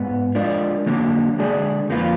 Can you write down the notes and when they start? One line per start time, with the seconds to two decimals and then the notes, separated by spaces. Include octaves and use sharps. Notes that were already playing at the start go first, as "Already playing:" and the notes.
Already playing: G#2 B3
0.35 G#3 D4 F4 A#4 D5
0.86 D3 F#3 A#3 D4
1.38 D3 G#3 D4 G#4 D5
1.89 F2 F3 A#3 F4 B4